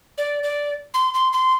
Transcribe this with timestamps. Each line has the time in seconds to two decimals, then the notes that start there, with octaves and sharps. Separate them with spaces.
0.18 D5
0.43 D5
0.94 C6
1.14 C6
1.32 C6